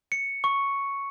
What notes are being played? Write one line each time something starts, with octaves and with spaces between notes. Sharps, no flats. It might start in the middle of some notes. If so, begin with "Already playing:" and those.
C#7
C#6